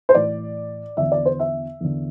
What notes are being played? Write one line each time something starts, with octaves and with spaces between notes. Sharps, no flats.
C5
A2 E3 D5
E2 D3 E5
D5
C5
E5
E2 D3